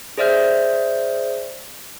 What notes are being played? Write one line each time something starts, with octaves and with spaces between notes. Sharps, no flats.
G#4 C5 D5 E5 F6 G6